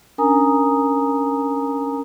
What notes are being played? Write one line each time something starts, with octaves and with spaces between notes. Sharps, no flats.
C#4 D4 A#4 G#5 A#5 D#6